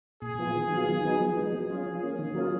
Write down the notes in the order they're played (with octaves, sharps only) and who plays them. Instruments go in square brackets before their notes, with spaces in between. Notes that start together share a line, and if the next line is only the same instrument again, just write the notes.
[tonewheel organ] A#2 [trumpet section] G#4
[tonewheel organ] F3 B3 F4
D#3
F#3 B3 F4
D#3
F#3 B3 D#4
F3
G#3 B3 D#4
[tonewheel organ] F#3 [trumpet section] G#4
[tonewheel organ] C#4 F4
F3
A#3 C#4
D#3
F#3 A#3 C#4 F4